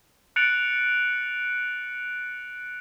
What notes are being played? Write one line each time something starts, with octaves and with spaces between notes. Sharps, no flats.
F#6 A6 C#7 D7 F7 F#7